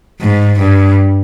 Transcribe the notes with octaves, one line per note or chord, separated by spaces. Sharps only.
G#2
G2